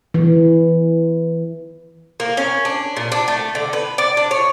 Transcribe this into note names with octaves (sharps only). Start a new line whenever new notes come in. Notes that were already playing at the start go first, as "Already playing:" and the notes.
E3
A#3
C#4
D4
A#2
D4
A3
D3
B4
D5
D4
C#5